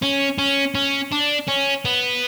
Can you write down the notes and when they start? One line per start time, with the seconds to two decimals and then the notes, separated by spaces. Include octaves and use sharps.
0.02 C#4
0.38 C#4
0.75 C#4
1.12 D4
1.48 C#4
1.85 B3